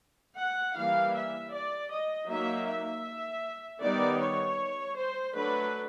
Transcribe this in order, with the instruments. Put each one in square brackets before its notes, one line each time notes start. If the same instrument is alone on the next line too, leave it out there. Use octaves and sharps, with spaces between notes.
[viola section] F#5
E3 G3 A#3 F5
E5
D5
D#5
F#3 A#3 D#4 E5
E5
D#3 G3 B3 D#4 D5
C#5
C5
F#3 A3 D4 B4